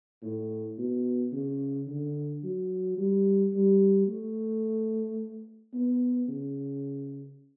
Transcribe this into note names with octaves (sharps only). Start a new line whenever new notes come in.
A2
B2
C#3
D3
F#3
G3
G3
A3
B3
C#3